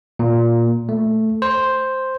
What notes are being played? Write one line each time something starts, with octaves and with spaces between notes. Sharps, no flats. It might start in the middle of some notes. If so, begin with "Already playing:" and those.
A#2
A3
C5